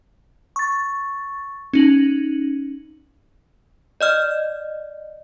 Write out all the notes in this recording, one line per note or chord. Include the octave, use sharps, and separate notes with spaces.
C#6 A6
C#4 D#4 F#7
D5 D#5 F6